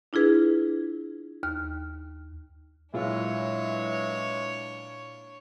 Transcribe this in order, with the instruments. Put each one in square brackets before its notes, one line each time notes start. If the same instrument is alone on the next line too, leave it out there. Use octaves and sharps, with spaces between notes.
[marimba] D4 E4 F4 G#4 B4
D#2 F6
[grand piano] A#2 E4 F4 [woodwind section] E3 F#3 G#3 [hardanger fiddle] D4 C#5